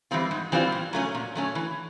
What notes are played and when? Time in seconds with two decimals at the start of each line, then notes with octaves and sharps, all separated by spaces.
0.11 E3 G3 C4 F4
0.31 G#2
0.52 E3 G3 C4 F4
0.72 A#2
0.93 F#3 A3 C#4
1.15 A#2
1.35 F#3 A3 C#4
1.55 E3